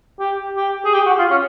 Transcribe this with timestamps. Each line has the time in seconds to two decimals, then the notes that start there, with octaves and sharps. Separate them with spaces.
0.19 G4
0.56 G4
0.85 G#4
0.94 G4
1.06 F#4
1.19 F4
1.30 C#4